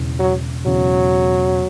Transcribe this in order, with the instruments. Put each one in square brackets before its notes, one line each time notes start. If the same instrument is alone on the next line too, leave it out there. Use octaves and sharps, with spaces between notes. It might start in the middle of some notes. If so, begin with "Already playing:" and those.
Already playing: [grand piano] E1 E2 C#3
[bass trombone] F#3
[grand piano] E1 E2 C#3 [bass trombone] F#3